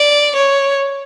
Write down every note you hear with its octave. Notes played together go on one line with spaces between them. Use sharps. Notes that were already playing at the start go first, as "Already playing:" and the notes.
Already playing: D5
C#5